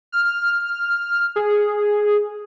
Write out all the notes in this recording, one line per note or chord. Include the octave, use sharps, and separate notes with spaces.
F6
G#4